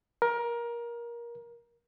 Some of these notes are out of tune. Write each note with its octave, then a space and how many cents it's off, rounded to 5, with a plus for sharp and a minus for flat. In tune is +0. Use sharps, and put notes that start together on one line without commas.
A#4 +20